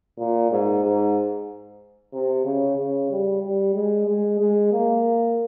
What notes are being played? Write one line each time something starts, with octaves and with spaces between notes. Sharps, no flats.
A#2
G#2
G#2
C3
C#3
C#3
G3
G3
G#3
G#3
G#3
A#3